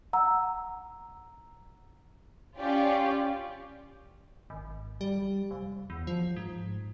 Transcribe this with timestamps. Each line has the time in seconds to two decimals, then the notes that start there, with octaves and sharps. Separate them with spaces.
0.13 F#5 A#5 E6
2.57 C#4 F4 G4 D5
4.50 G#1
5.01 G3
5.51 F1
5.90 E2
6.07 F3
6.36 G#2